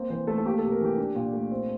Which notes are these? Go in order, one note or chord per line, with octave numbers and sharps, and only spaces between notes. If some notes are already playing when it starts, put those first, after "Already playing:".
Already playing: A#3 C4
E3 C5
A3 A4
A4
A#3 G4
A4
C3
A#4
E3 G4
D4
A#2
A3
C4